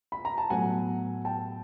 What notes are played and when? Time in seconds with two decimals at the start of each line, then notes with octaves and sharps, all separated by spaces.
0.12 B5
0.25 A#5
0.38 A5
0.50 A2 F#3 B3 F#5 G#5
1.25 G5 A5